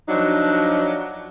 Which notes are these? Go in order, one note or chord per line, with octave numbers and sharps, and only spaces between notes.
F3 F#3 D4 D#4